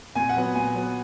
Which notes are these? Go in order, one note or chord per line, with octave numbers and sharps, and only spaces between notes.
A#2 G#5
F#5
F#3 B3
A#2 G#5
F#3 B3